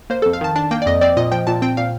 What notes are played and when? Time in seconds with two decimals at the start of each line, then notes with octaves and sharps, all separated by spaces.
0.10 A#3 C5
0.22 A4
0.26 F2
0.33 F5
0.41 D#3 A5
0.56 D4 A5
0.71 A#3 G5
0.82 D5
0.86 F2 D#5
1.01 C4 D5
1.17 A#2 D#5
1.32 F3 G5
1.47 A#2 A5
1.62 C4 G5
1.77 A#2 F5